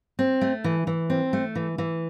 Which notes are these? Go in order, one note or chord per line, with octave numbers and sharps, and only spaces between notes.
C4
A3
E3
E3
C4
A3
E3
E3